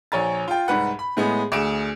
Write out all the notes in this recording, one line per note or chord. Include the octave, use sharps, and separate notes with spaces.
A#1 C#5 G#5 A#5 A6
F4 G5
C2 G#2 B4 F#5
B5
A2 G#3 B3 G#4
D2 G#4 D7 E7